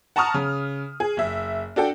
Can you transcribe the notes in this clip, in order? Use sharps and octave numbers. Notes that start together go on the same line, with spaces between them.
F#5 A5 A#5 C#6 D#6 F6
C#3
G#4
F#1 E5
D4 F#4 A4 G5